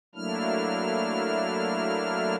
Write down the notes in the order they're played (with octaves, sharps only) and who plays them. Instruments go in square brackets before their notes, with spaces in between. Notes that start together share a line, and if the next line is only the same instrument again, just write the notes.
[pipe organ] F#3 A3 A#3 D4 E4 F6